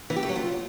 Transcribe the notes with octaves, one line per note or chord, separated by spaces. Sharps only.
E3
G4
A3
F#3
F4